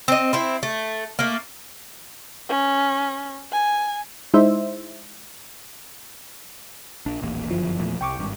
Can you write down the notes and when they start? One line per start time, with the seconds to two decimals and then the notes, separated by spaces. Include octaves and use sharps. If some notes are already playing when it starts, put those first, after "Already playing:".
0.08 C4 D#5
0.33 C4 E4
0.63 A3
1.19 A3 A#3
2.49 C#4
3.52 G#5
4.34 G#3 D#4 E4 C5 E5
7.06 A#1 D4
7.22 D#1 A1 A#3
7.51 G1 F#2 E3 F3
7.80 E2 A#2 A3
8.01 C2 G5 C#6 D6
8.19 G#1 G2